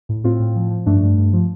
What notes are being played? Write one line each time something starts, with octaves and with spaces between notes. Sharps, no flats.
A2
A2 C4 F4
A2
F3
F3
G2 A3 D4
G2
G2
F3